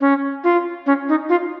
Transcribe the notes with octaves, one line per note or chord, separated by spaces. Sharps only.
C#4
F4
C#4
D#4
F4